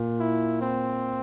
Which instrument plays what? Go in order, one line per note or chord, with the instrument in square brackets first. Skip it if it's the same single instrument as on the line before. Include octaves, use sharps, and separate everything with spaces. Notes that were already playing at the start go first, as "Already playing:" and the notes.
Already playing: [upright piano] A#2
[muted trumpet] E4
C4